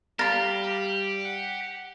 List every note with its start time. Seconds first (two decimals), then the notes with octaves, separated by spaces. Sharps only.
0.19 G3 G4 F5 A#5 B5 A6 A#6
1.25 F#5